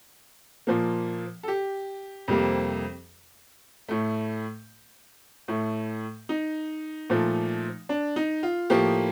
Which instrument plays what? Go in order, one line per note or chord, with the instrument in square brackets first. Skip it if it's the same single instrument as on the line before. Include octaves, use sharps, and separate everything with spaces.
[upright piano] A#2 F3 A#3
A4
G4
F2 C3 G3 A#3
A2 A3
A2 A3
D#4
A#2 F3 A3
D4
D#4
F4
A2 F3 A#3 G4